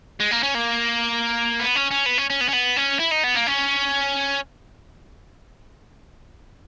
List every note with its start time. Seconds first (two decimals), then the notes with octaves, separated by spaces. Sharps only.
0.20 G#3
0.31 A#3
0.43 C#4
0.55 A#3
1.59 B3
1.75 C#4
1.91 C#4
2.06 B3
2.18 C#4
2.30 C#4
2.41 B3
2.48 C#4
2.53 B3
2.76 C#4
2.99 E4
3.11 D#4
3.24 B3
3.35 A#3
3.47 C#4